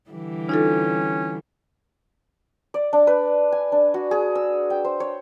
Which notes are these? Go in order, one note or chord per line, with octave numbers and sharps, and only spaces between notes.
D3 E3 G3
C#4 D#4 F4 A4
D5
D4
B4
G#5
D4
F#4
G#4
E6
G5
C5
C#5